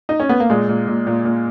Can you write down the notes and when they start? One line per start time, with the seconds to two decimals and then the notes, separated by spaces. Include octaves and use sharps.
0.09 D#4
0.20 C#4
0.29 B3
0.40 A#3
0.50 A#2 G#3
0.69 A#2
0.87 A#2
1.07 A#2
1.25 A#2